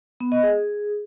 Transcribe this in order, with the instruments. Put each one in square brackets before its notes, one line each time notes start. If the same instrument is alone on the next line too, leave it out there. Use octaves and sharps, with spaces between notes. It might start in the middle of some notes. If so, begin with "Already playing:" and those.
[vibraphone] B3
D#5
G#4